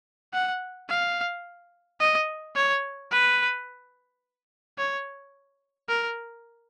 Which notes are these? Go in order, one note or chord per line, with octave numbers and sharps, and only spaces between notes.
F#5
F5
D#5
C#5
B4
C#5
A#4